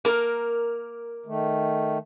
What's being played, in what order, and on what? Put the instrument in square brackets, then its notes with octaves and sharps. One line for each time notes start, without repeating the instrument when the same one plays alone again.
[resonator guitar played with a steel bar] A#3 A#4
[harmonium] D#3 A3